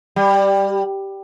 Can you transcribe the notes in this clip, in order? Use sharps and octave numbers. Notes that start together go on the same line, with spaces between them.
G3